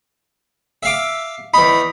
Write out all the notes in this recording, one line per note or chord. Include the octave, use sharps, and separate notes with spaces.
E5 F5 D6
E2 D#4 B5